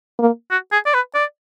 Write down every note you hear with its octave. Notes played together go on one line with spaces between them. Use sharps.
A#3
F#4
G#4
D5
B4
D5